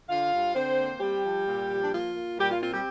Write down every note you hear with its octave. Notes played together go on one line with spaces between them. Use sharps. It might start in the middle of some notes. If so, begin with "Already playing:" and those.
D3 F4 F5
G2
D3 C4 C5
A#3
G3 C4 G4
F3
A#2
F3
D4
A#3 F4
A#3
A#2 G3 G4
F4
C4 F4
G3 G4